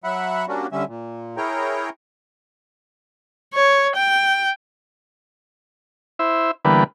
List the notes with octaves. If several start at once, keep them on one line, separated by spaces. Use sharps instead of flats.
F#3 E5 F#5 B5
G3 A#3 C#4 D4 F#4
D3 G3 C#4 E5
A#2
E4 G#4 A#4 C#5 G5 A#5
C#5
G5
E4 C5 E5
D3 E3 G3 A#3 B3 B4